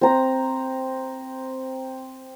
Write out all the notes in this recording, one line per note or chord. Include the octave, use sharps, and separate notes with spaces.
C4 A#5